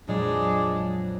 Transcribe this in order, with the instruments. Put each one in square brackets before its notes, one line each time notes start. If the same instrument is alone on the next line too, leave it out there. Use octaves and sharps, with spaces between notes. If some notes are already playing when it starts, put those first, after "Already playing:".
[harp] F2 A#2 F#3 [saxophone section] G#3 D4